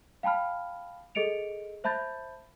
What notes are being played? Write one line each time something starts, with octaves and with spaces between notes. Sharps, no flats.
F5 G5 A5 B5 F6
G#4 A4 D#5 C#7 D7 F7
C5 E5 A5 B5 G6 A6